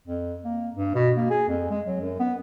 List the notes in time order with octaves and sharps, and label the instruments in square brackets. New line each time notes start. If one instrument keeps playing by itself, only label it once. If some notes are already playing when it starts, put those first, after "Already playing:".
[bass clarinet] F2
A#3
G2
B2
A#3
G#4
F2
G#3
F#3
F#2
B3